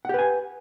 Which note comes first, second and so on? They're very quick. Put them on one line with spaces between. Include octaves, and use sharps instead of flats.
F#5 G4 B4 G#5